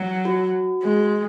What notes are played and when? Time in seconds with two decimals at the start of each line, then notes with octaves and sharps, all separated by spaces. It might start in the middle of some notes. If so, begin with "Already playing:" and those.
Already playing: F#3
0.25 F#4
0.83 G#3